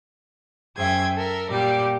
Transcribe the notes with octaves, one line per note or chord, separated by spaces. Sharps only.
F#2 G#4 C5 E5 G5 G#6
A4 A#4 E5
A#2 G3 G4 D5